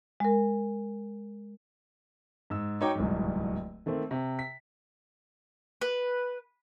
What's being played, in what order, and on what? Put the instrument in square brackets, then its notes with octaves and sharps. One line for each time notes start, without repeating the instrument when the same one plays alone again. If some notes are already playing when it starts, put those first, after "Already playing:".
[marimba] G#3 A#4
[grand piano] G#2 E6
D#4 F#4 C#5 G5 A#5 D6
D1 C2 G#2
D#3 A3 A#3 C4
C3
B6
[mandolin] B4